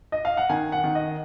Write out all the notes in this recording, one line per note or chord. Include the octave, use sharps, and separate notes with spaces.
D#5
F5
F#5
D#3 G#5
F#5
D#3
D#5